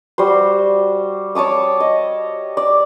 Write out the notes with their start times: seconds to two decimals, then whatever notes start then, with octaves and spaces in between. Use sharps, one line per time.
0.18 G3 F#4 C5
1.35 C#5 A5 D6 D#6
1.80 D#5
2.57 D5